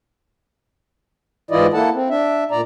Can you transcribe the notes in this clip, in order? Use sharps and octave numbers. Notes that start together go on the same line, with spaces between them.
G#2 E3 E4 F4 D5 D#5
A#3 E4 A4 F#5 A5
C4
D4 E5
A#2 D5 A#5